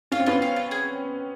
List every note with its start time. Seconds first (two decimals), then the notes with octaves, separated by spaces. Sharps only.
0.12 C#4 F4
0.20 C4
0.26 B3 C#4 F4
0.42 F5
0.56 F4
0.71 G#4